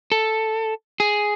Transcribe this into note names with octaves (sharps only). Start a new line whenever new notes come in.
A4
G#4